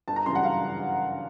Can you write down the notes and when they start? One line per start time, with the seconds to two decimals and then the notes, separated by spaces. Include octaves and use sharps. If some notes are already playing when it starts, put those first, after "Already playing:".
0.08 G1 A5
0.16 A#5
0.26 F#2 C#3 E3 G3 C6
0.35 F#5
0.45 G1 F5
0.64 C#3